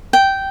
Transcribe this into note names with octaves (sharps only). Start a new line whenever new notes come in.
G5